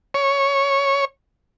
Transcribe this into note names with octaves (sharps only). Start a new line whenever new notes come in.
C#5